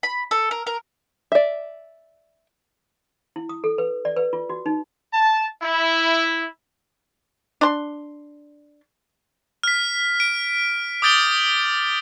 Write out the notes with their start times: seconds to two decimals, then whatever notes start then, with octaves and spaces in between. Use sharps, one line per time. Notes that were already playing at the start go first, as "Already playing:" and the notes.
0.03 B5
0.31 A4
0.51 A#4
0.67 A#4
1.32 D5 E5
3.36 E4
3.49 D#6
3.64 A4
3.78 B4
4.05 D5
4.17 B4
4.33 F4
4.50 F#4
4.66 D#4
5.13 A5
5.62 E4
7.61 D4 C6
9.63 F6 B6
10.20 D7
11.02 D6 D#6 G6 A6 D7 G7